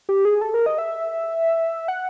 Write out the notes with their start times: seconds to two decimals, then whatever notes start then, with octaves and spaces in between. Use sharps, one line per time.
0.09 G4
0.25 G#4
0.41 A4
0.54 A#4
0.66 D#5
0.78 E5
1.88 F#5